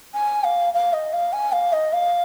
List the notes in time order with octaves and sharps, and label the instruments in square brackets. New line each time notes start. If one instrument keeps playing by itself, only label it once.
[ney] G#5
F5
F5
D#5
F5
G#5
F5
D#5
F5